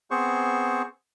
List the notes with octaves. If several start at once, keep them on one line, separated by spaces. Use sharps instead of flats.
B3 C4 G#4 C5 C#6